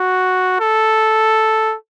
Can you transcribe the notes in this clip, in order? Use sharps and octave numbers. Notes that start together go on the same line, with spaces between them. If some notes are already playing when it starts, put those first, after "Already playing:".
Already playing: F#4
A4